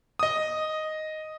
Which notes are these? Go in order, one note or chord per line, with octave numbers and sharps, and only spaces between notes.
D#5 D#6